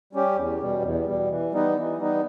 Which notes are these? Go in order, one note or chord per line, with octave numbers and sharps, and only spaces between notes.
G3 C#4 G4
E2
B2 G3
E2
B2 G3
E3
G3 B3 D#4
E3
G3 B3 D#4